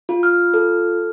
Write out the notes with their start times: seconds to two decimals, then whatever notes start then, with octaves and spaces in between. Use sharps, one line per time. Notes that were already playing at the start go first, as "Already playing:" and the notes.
0.09 F4
0.23 F6
0.54 A4